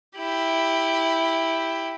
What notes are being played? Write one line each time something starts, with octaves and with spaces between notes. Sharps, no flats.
E4 G4